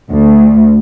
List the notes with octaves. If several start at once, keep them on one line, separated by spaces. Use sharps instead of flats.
D2